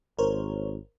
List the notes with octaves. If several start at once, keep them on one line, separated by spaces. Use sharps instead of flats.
G#1 A#4 C5 C#5